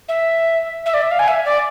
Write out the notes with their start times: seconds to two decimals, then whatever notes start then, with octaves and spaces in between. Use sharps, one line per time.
0.08 E5
0.86 E5
0.94 D5
1.02 E5
1.11 F5
1.19 G#5
1.28 E5
1.45 D5